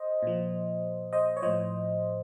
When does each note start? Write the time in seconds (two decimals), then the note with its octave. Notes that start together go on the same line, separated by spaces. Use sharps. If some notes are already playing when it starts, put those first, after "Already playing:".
Already playing: C5 D#5
0.23 A#2 F3
1.13 C5 D#5
1.37 C#5
1.42 A2 F3 C5 D#5